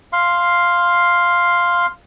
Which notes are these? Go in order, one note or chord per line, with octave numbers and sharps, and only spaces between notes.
F5 C6